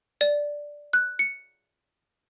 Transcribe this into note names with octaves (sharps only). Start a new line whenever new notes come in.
D5
F#6
C#7